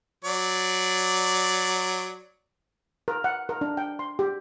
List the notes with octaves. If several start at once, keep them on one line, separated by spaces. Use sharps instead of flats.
F#3 D5
A#4
F#5
A#4
D4
G5
C6
G4